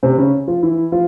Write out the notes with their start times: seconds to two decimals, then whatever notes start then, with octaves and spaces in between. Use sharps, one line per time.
0.03 C3 C4
0.18 C#3 C#4
0.47 F3 F4
0.63 E3 E4
0.92 F3 F4